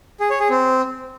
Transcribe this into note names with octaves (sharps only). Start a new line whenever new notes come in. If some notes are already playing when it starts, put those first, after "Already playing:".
G#4
C#5
G#4
C4